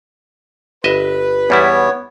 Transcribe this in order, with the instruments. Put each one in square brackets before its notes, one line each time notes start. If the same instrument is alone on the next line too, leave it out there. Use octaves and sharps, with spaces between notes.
[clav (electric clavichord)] G1 D#5 E5 [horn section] B4
[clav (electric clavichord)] E2 G3 E4 [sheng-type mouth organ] B3 C#5